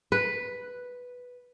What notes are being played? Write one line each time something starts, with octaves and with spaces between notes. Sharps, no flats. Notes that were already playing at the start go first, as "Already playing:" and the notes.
B4